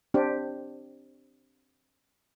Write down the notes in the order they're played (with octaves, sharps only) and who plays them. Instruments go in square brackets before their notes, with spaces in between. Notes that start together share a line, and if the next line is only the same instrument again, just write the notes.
[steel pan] C4 D4 G4